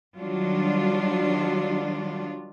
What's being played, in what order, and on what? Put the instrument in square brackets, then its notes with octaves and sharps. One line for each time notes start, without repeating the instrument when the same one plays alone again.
[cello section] D#3 F#3 G3 D4 F4